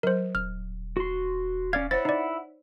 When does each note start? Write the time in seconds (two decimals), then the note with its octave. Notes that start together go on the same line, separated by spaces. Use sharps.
0.03 F#3 A#4 C5
0.35 D#1 F6
0.97 F#4 C6
1.73 C#4 D5 F5 G#6
1.91 E4 C5 C#5 F#5 A6
2.05 D#4 D5